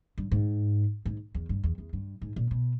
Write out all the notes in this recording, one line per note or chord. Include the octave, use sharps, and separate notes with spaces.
G2
G#2
G#2
E2
G2
E2
E2
G2
G#2
A#2
B2